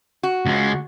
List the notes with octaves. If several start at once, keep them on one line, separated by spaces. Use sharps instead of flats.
F#4
C#2 G#3